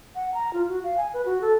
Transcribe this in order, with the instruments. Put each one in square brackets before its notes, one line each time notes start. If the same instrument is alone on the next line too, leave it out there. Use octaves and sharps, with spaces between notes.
[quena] F#5
A#5
F4
F#4
F5
G#5
B4
F#4
A4